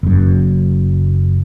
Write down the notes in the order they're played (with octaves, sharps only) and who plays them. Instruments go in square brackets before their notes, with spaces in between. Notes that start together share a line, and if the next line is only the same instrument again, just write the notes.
[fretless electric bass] F#1 F#2